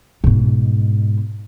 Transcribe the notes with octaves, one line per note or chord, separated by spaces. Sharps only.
G#2 B2